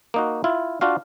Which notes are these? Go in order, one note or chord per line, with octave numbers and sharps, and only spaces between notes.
A#3 D#4 F#4
E4 F4
D4 F4 F#4 F5